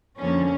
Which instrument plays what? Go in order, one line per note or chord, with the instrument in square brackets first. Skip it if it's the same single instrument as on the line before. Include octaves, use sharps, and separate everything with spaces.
[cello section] F2 D3 F3 A#3 C#4